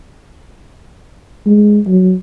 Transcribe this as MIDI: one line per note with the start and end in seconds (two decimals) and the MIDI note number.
1.46 1.79 56
1.87 2.14 54